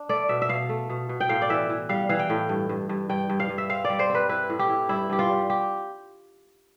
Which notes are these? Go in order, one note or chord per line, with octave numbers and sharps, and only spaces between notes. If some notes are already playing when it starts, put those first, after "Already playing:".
Already playing: D4
A3 D5
B2 E5
E5
B2 F5
A3
B2
B2
G5
A2 F5
D5
E3 E5
E3
G3 F5
E3 F5
G5
A2
G2
G2
G2
G2 G5
G2
F5
G2
E5
C4 F5
D5
G3
C5
C4 B4
E4 B4
A2
G4
E4
G2 E4
G2 G4
F4
G3
G4